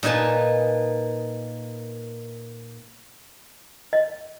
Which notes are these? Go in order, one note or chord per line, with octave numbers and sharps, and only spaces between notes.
A#2 D#4 B4 G#5 A5
D#5